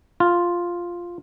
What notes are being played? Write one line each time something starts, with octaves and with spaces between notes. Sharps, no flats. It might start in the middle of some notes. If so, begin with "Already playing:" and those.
F4